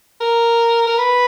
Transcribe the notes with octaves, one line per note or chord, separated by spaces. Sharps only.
A#4
A#4
B4